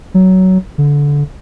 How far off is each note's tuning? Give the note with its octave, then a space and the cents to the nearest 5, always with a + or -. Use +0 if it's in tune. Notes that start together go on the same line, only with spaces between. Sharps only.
F#3 +15
D3 -20